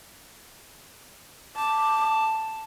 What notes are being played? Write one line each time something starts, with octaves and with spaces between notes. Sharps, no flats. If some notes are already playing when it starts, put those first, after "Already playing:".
A5 D6